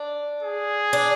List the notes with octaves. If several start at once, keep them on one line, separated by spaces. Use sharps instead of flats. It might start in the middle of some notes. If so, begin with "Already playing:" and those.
Already playing: D4
G#4
D4